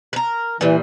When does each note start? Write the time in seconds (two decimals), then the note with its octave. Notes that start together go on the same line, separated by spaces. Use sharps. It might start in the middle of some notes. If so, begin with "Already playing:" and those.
0.13 A#4 B4
0.61 A#2 E3 G3 B4